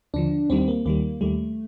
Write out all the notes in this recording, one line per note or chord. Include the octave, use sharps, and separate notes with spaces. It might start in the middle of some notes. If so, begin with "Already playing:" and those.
D#2 D3 F3 D4
D#2 D#3 G3 C4
A#3
D#2 D#3 G3 A#3
D#2 D#3 G3 A3